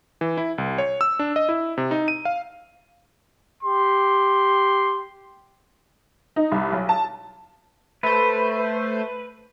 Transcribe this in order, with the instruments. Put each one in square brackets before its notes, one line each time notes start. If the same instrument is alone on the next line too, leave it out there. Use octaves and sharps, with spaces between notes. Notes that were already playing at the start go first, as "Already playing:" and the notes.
[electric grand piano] E3
E4
C2
C#5
E6
D4
D#5
E4
C3
D#4
D#7
F5
[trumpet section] G4 C6
[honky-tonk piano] D#4
C2
B1
A5
[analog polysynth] A3 C5 [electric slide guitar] B4